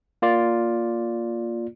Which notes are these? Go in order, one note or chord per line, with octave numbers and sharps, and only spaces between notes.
A#3 F4 D5